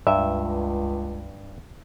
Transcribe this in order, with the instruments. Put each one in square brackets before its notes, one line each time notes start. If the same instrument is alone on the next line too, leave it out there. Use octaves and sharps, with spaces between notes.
[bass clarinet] C#2 [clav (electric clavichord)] G2 [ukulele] E5